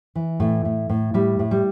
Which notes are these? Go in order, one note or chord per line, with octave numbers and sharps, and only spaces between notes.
E3
A2 A3
A2
A2
A2 G3
A2
G3